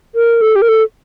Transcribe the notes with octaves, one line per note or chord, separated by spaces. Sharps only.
A#4
A4
G4
A#4
A4